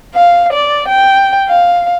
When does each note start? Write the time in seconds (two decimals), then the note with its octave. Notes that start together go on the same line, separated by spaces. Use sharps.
0.15 F5
0.53 D5
0.88 G5
1.49 F5